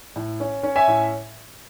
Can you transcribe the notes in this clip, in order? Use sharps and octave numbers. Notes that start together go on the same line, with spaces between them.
A2
C#4
C#4
E5 G#5
A2